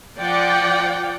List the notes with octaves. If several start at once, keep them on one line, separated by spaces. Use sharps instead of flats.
F3 D5 F#5 G5